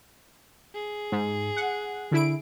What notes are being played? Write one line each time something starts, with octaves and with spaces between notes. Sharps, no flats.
G#4
G#2
F#5
D3 E4 D7